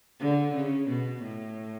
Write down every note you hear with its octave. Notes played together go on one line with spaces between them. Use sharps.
D3
C#3
B2
A2